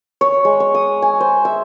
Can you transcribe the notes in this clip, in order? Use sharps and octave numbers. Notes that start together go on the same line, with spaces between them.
C#5
G#3
C#6
D#6
G#5
C5
E5